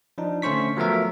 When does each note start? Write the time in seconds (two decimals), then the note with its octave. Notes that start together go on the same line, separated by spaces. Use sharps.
0.18 F3 D4 D#4
0.42 D3 A3 C#4 C5 C#6 B6
0.77 F3 F#3 A3 B3 A#4 E5